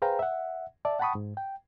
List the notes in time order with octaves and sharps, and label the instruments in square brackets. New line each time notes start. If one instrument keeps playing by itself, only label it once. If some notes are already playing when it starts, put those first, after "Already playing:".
[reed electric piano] G#4 B4 C5 F5 G5 A#5
E5 F#5
D5 E5 A5
F#5 G5 A5 B5 C#6 D#6
G#2
G5